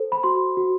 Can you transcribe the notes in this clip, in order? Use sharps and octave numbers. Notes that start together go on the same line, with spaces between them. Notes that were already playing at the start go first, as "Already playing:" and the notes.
Already playing: A4 C5
B5
F#4 C6
F#4